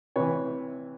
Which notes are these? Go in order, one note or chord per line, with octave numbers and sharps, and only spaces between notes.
C3 E3 B4 C#5